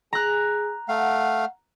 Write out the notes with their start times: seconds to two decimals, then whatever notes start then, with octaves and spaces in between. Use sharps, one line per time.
0.13 G#4 A#5 F#6
0.88 A3 F5 F#5